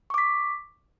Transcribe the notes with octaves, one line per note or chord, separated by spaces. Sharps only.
C#6 D6 B6